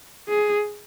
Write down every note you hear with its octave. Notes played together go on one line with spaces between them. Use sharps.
G#4